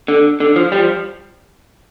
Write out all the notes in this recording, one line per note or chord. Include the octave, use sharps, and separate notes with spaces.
D3
D3
F3
G3
F3